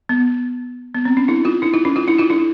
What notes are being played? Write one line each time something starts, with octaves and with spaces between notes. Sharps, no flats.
B3
B3
C4
C#4
D4 E4
D#4 F4
D4 E4
D#4 F4
C#4 D#4
D#4 F4
D4 E4
D#4 F4
D4 E4